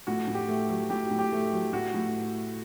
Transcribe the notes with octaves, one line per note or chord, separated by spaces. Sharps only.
A2 F#4
A2
G4
A3
F#3
A2 G4
A2
G4
A3
F#3
A2 F#4
A2